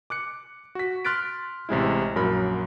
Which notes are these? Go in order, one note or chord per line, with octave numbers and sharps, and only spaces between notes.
D6 F#6 C#7
F#4 B6
C6 F6 F#6 A6 B6 D7
A1 C3 G#3 E4
A#1 F#2 F#3 A#4 B5